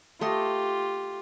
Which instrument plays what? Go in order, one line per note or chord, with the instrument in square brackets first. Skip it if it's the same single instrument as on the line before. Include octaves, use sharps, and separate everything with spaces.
[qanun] A3 D#5 C6 [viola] F4 G4